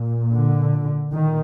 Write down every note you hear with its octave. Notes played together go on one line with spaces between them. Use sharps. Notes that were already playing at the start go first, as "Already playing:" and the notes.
Already playing: A#2
D3
A#2 D#3